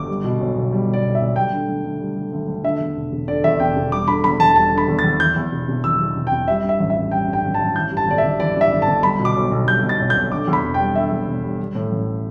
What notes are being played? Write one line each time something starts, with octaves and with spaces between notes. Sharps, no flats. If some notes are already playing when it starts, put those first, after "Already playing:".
Already playing: G1 D6
G3
B2
B1
B1
G3
B2
D5
B1
E5
B1
G3 G5
D3
D2
D2
G3
D3
D2
D2
D3 E5
E2
E1
E1
D3 D5
E2 E5
E1 G5
E1
G3 D6
D3 B5
E2 B5
E2 A5
G3 A5
D3
B5
E2
A6
E2
E3 G6
E2
E1
E1
E3 E6
E2
E1
G5
E1
G3 E5
G2 E5
A1
E5
A1
G3 G5
G2
G5
A1
A5
A1
E3 G6
G2
A5
G1 D5
E5
G1
E3 D5
G2
E5
G1
A5
G1
G3 B5
B2
D6
B1
B1
G3 G6
B2
A6
B1
G6
B1
D3 D6
E2
B5
E1
G3 G5
D3 E5
E2
E1
G3
G3
A2
A1